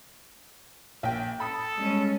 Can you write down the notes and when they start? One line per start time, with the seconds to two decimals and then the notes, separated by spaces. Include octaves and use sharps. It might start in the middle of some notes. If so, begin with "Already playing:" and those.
1.03 A#1 G5
1.40 A4 B5 D#6
1.77 G3 G#3 C#4